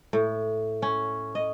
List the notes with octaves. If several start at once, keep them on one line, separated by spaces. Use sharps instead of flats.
A2
C#4
D#5